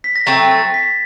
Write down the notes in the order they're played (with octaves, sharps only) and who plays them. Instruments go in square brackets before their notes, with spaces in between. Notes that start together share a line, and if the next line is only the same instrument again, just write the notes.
[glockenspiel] B6
A#6
[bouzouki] F#3 A3 C4 [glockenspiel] A6
[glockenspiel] A6
B6